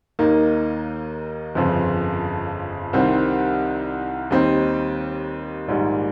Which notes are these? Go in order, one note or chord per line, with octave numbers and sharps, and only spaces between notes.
D#2 D#3 A#3 D#4
G1 F2 C#3 F3
C2 C3 D#3 G3 C4
D#2 D#3 G3 C4 D#4
A#1 G#2 D#3 G3